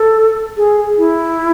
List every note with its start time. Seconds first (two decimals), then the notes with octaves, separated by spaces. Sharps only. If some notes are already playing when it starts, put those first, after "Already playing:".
Already playing: A4
0.57 G#4
0.98 E4